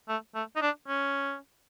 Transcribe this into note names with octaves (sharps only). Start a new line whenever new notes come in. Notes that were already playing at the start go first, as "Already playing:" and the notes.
A3
A3
D#4
D4
C#4